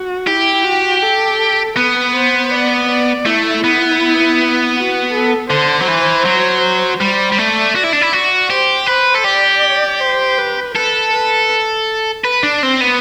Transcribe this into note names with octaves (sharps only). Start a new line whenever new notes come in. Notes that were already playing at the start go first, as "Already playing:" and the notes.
Already playing: F#4
E4 G4
F#4
A4
B3 B4
C5
D5
D5
A3 E4
B3
F#4
A4
D3 C5
F#3
E3
F#3
G3 C5
G3
A3 D5
F#4
E4
D4
E4
F#4
G4 C5
B4 C5
A4
G4 D5
C5
B4
A4 B4
B4
B4
D4
C4
B3